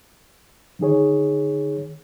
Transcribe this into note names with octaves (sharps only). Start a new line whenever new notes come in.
D3 D#3 D#4 G#4 C#5